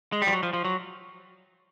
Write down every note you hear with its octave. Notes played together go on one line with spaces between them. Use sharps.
G#3
G3
F3
F#3
F3
F3
F#3